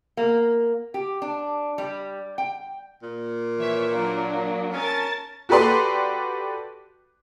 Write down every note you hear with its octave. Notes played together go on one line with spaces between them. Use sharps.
A#3
G4
D4
G3
G5
A#2
E3 C#5 E5
F#3 A#3 D4
C#4 A#4 A5 A6
F#4 G4 A4 B4 D5 C6